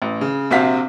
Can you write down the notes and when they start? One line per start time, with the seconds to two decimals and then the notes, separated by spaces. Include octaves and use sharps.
0.02 A1
0.21 C#3
0.51 A#1 C3 C4 F#4 F5 B6